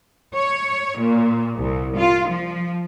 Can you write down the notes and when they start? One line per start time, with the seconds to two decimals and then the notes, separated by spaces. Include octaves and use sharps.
0.34 C#5
0.98 A#2
1.58 C2
1.96 F4
2.28 F3